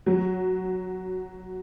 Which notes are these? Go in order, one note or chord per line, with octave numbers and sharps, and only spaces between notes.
F#3